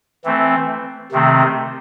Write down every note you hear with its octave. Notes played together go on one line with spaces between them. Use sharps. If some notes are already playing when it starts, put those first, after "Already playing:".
E3 A3 C4
C3 D#3 A3 C4